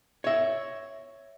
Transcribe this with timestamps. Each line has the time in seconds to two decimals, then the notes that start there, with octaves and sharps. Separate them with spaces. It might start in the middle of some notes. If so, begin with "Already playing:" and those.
0.24 C#5 E5